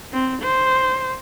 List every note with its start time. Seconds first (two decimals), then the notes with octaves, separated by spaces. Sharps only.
0.13 C4
0.43 C5